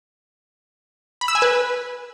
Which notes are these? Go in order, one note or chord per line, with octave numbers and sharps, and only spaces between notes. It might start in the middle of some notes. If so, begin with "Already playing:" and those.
B5
E6
G#5
B4